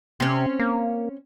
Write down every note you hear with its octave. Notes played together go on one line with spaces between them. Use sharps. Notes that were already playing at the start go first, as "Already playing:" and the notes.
C3 C4 C#4
A#3